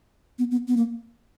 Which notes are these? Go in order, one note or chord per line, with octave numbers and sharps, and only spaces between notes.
B3
B3
B3
A#3